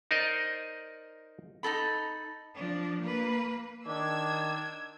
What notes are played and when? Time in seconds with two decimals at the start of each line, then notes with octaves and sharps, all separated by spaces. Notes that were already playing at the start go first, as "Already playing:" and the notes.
0.11 D#4 A#4 C5 D5 D#5
1.63 D#4 E4 A4 B5
2.55 F3 D4
3.02 A#3 B4
3.86 D#3 D4 E6 G#6